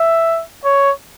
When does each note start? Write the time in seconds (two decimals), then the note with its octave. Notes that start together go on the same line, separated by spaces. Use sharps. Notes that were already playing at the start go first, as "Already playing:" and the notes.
Already playing: E5
0.65 C#5